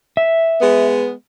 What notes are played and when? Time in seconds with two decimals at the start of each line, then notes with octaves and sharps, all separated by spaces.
0.17 E5
0.61 G#3 B3